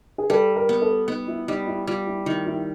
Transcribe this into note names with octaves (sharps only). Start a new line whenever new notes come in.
G#4
G3 A4
A#4
B3
A4
B3 D#4
E4
G3 D#4
E4
G3 F4
E4
D#3 E4
E4